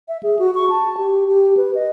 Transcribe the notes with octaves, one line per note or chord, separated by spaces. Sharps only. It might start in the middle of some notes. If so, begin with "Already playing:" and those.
E5
G#4
F#4
C#6
A5
G4
G4
B4
D#5